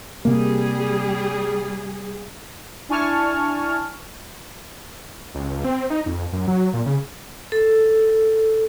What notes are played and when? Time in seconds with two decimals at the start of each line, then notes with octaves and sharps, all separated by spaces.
0.25 C3 G3 A#3 G#4
2.89 D4 E4 G#5 A5 C#6 F6
5.34 C#2
5.64 C4
5.90 D#4
6.06 F2
6.33 F#2
6.48 F#3
6.73 A#2
6.86 C#3
7.52 A4